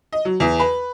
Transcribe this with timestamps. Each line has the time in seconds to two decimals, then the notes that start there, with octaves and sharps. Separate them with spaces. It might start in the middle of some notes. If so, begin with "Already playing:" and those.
0.13 D#5
0.25 F#3
0.40 E2
0.60 B4